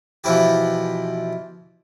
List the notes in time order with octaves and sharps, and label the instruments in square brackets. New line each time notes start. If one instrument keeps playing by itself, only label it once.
[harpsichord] B2 E3 F3 E4 G4